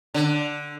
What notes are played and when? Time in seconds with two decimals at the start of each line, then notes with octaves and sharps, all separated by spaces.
0.14 D3